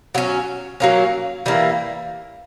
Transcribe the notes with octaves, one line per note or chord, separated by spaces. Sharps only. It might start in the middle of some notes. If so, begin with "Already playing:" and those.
F#3 A#3 C#4
F#3 A#3 C#4
E3 G3 A#3